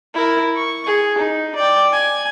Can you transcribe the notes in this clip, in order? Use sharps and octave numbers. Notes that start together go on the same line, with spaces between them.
E4 A#4
C#6
G#4
D#4
D5 G5
G#5